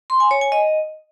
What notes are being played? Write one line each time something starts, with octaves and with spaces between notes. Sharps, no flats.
C6
G#5
C#5
G#5
D#5